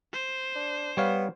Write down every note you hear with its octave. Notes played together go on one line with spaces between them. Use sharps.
C5
D4
G3 B3 C#5 F5